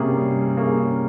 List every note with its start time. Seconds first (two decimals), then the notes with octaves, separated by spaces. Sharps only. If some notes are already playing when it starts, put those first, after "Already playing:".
Already playing: C3 G3 A#3 C#4 G#4
0.17 G3
0.57 A#3 C#4 G#4